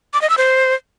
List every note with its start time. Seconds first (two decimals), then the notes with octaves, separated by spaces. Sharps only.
0.14 D6
0.22 D#5
0.30 E6
0.38 C5